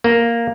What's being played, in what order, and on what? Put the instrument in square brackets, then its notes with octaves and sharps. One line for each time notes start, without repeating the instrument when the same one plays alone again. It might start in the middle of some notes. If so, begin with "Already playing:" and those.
[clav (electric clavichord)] A#3